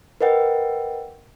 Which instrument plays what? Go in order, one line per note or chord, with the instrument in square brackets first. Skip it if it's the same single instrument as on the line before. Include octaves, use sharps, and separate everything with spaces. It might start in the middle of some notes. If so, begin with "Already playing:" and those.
[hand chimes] A#4 B4 D#5 F#5 G5